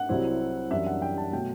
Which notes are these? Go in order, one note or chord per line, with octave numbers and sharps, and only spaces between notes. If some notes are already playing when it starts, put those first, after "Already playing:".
Already playing: F#5
C2 C3 F#3 C4 E4
F#2 E3 G3 D4 E5
F#5
G5
A5
B2 F#3 A3 G5